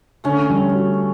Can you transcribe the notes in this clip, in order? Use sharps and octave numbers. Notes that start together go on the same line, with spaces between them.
D3 A3 C#4
G3
F#4